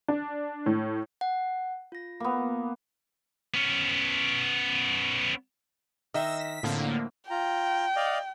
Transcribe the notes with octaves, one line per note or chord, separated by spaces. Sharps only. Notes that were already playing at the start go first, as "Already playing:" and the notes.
D4
A2
F#5
F4 A#6
A#3 B3
B3 C#4
D#3 D#5 E5 E6 A#6
B6
A2 D3 F3 A#3 C4
F4 G5 A#5
D5 D#5 F5